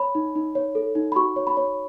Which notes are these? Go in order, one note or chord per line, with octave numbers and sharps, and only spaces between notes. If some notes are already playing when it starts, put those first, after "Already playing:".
Already playing: C#5 B5
D#4
D#4
C#5
A4
D#4
B5
F#4 C#6
C#5
B5
C#5